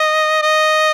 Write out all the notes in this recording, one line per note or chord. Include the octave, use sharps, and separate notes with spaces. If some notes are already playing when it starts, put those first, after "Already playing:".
Already playing: D#5
D#5